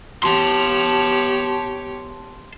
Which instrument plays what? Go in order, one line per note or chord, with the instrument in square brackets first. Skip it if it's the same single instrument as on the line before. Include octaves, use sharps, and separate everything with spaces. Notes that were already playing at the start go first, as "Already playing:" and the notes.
[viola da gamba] B3 G4 C#5 [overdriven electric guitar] A5 C6